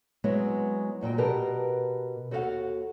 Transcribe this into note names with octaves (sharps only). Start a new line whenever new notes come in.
F#3 G#3 B3 C4 E4
F2 A#2 F#3 G5
B2 G4 A#4 B4 A5
D#2 F#4 A4 C5 F5 F#5